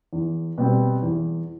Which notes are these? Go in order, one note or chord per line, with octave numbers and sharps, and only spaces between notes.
E2
B2 G3 C4
E2